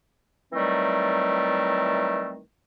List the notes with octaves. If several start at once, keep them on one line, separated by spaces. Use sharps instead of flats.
D#3 E3 F#3 G3 A3 C4